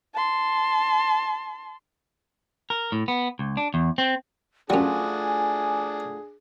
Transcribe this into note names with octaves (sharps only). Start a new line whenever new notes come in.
A5 C6
A#4
A2
B3
C#2
D4
E2
C4
F#2 G3 A3 D4 F4 F#4 G#4 G#5